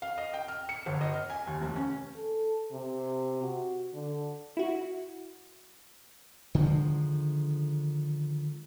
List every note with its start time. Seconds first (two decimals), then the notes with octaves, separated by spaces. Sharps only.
0.02 F5
0.18 D#5
0.33 G5
0.48 F6
0.69 C#7
0.86 G1
1.01 D#5
1.14 F6
1.30 G#5
1.47 D#2
1.61 F1
1.76 C#4
2.16 A4
2.72 C3
3.43 F#4
3.93 D3
4.57 E4 F#4
6.55 D3 D#3 F3 G#3